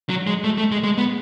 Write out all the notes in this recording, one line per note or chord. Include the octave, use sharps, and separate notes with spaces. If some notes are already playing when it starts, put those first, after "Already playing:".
F#3
G#3
A3
A3
G#3
G#3
B3